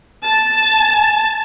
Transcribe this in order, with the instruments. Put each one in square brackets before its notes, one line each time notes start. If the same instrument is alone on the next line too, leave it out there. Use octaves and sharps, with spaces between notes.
[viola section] A5